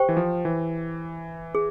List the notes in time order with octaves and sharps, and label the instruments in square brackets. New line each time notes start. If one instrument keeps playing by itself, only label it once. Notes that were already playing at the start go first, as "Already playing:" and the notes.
Already playing: [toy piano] G4 C5 G5 C#6
[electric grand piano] E3
F3
E3
[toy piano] G#4